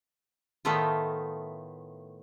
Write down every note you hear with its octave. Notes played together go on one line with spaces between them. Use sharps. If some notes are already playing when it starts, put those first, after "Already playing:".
A2 D#3 A3 B3 D#4 F4